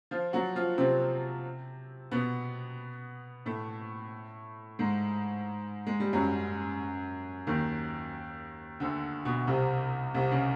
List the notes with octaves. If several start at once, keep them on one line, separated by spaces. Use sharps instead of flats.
F3 F4
F#3 F#4
F3 F4
C3 C4
B2 B3
A2 A3
G#2 G#3
G#3
G3
F#2 F#3
D#2 D#3
D2 D3
B2
C2 C3
C2 C3
C#3